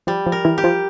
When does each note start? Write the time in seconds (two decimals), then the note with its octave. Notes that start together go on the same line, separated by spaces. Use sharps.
0.07 F3 G3
0.26 F3
0.32 A#4
0.45 E3 E4
0.58 G4
0.64 F3 F4